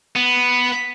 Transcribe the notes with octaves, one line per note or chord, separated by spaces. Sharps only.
B3